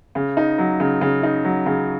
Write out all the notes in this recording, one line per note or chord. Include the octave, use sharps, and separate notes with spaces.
C#3
D#4
F#3
C#3
C#3
D#4
F#3
C#3